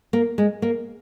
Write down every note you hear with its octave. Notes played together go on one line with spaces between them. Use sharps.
A#3
G#3
A#3